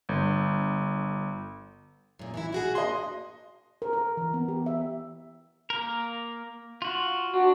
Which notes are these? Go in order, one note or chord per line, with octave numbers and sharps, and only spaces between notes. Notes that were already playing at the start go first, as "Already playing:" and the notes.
G1
F#2 A#2
E3 F#3 E4
E4 F#4 G#4
A#3 F#4 D#5 C6
A#4
A#4
E3
B3
G4
E5
A#3 A#4
F4 F#4
D4 F#4